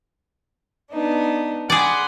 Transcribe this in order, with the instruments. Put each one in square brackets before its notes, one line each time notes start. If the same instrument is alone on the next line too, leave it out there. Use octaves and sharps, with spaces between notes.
[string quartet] B3 D4 D#4
[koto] G#4 D5 [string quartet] F#5 B5 C6